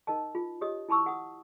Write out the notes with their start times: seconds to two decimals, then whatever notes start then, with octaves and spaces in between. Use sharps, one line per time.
0.07 D#4 A#4 D#5 A5
0.35 F4
0.61 G4 C#5 D#5 D#6
0.88 E4 A5 B5 C#6 E6
1.06 F#5 D#6